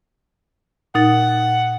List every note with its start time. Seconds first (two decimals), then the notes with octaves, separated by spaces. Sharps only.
0.95 A#2 D#4 F#5 A6